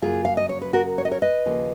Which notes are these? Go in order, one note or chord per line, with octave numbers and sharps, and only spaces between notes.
F#2 C#3 F#3 A#3 F4 G#4
F5
D#5
C#5
B4
F#4 A#4
C#5
D#5
A#4 C#5
B4 D#5
D#2 C#3 F3 A#3